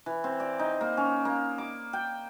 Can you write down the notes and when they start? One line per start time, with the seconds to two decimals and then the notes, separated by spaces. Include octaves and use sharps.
0.06 E3
0.24 C4
0.40 D5
0.59 D#4
0.81 A#3
0.97 C#4
1.25 A#3
1.58 D6
1.93 G5